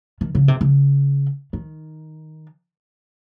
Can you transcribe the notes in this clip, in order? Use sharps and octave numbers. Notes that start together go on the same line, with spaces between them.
D#3
C#3
C3
C#3
D#3